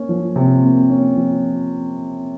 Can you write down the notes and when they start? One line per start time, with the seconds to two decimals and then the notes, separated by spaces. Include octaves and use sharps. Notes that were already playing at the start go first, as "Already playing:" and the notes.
Already playing: A#3 C#4
0.09 F3
0.36 C3
0.63 A#3
0.90 C#4
1.16 F3